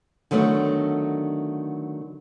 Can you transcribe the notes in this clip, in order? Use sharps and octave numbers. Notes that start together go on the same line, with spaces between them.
D3 D#3 F#3 A3 B3 D4